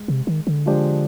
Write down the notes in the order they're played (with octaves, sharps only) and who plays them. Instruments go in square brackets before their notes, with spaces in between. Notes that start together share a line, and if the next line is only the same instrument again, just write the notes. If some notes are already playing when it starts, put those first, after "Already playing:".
Already playing: [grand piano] G#3
[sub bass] C3
D#3
D3
[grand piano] F3 G#3 D4 G4 C5